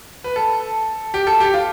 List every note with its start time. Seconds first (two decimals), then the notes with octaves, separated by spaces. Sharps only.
0.24 B4
0.36 A4
1.14 G4
1.27 A4
1.40 G4
1.54 F4